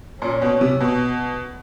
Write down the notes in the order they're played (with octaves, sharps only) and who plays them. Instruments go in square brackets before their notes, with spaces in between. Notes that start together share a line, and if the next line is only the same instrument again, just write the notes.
[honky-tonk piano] A#2 [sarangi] C#4
[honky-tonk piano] B2
C3
B2